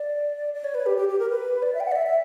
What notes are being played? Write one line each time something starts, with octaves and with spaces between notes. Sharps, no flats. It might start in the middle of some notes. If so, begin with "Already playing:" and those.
Already playing: D5
D5
C#5
B4
G4
G4
G4
A#4
B4
D5
E5
G5
F#5
D5
E5
E5